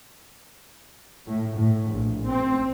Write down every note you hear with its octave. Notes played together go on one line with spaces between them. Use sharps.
A2
A2
A#1
C4